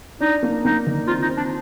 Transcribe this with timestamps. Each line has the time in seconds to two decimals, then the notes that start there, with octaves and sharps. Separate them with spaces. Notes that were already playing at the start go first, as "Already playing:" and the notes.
0.21 D4 D#4
0.43 A#3
0.64 A#3 D#4
0.86 D#3
1.07 C4 F4
1.22 D#4
1.29 C4
1.37 D4